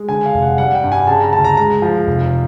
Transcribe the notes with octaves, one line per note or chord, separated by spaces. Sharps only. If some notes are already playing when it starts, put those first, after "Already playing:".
Already playing: G#3
D3 G#5
F5
F1
F#5
G3 F#5
G5
G2
G#5
C#3 A5
A#5
D2 A5
A#5
G#3 A#5
F3
F1